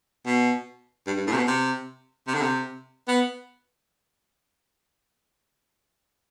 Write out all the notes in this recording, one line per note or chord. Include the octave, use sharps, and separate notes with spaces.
B2
G2
G2
A2
C3
B2
C3
C3
D3
C3
B3